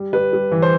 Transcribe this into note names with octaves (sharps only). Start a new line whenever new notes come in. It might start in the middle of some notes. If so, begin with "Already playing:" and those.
Already playing: G3
G3 B4
G3
E3
C5